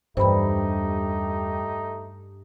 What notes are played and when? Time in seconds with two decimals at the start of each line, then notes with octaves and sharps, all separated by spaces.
0.17 E2 G2 G3 A3 D#4 G4 C5 B5